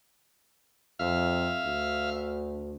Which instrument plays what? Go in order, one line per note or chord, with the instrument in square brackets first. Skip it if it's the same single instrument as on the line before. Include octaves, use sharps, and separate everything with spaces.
[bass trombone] F2 [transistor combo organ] E5 F5 F6
[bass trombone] D2